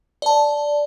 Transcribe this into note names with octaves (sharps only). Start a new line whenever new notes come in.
D5 A5